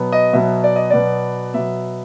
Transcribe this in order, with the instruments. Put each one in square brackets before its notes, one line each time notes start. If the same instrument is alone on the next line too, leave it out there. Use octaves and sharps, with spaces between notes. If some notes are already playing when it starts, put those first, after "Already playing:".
Already playing: [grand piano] B2 F#3 B3
D#5
B2 F#3 B3 E5
D5
D#5
B2 F#3 B3 D5
B2 F#3 B3 E5